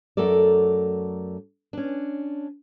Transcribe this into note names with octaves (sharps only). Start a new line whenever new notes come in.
F#2 F#3 A3 A4 A#4 D5
C#4 D4